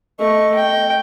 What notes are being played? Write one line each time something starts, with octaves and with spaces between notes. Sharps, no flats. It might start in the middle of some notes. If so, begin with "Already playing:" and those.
A3 D#5 C#6
G5